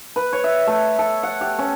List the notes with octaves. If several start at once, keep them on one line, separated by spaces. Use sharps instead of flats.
B4
C#5
E5
A3
A4
F#5
G4
C#4